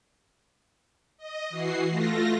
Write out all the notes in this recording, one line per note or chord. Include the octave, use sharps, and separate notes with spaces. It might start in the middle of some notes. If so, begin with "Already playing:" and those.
D#5
E3 F#4 C7
A3 F4 A#6